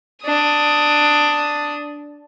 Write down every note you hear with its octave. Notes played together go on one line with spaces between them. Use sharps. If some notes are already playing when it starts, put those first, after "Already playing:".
D4 D#6